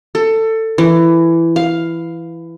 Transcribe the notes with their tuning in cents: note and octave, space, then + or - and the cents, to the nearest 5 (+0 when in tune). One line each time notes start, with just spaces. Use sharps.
A4 +20
E3 +15
F5 +5